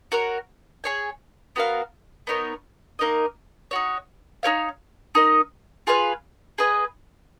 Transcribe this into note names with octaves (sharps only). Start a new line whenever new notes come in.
F#4 A#4 C#5
G#4 C#5 G#5
B3 F#4 A#4 F5
B3 D#4 A#4 C#5
A#3 D#4 A#4 D#5
D#4 F#4 C#5
D#4 A#4 C#5 F5
D#4 A#4 D#5
F4 G#4 B4 F5
G#4 B4 D#5 G#5